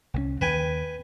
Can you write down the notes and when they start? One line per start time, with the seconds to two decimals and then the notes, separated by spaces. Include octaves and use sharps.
0.14 C2 F#3 C#4
0.41 D#2 B4 G5 G#5